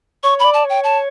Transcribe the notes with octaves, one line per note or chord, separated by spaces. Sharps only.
C#5 C#6
D5 B5
A5
C#5
G5
A5